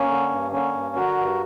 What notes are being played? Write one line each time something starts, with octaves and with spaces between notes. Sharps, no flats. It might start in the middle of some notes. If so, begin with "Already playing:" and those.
Already playing: A#3 C#4
D3
G2
D3 A#3 C#4
G2
D3 F#4 A#4
G2